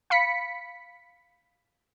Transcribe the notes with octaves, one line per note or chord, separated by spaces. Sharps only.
F5 B5 B6 C#7